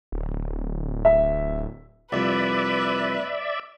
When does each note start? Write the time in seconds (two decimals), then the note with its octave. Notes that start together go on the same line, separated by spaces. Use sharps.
0.12 D1
1.05 E5
2.12 C2 F2 B4 D5 E5